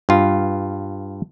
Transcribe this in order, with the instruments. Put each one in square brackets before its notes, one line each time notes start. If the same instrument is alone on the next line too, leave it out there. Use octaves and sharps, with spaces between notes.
[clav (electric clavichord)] G2 F4